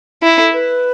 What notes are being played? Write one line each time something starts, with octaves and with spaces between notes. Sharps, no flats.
E4
A4
B4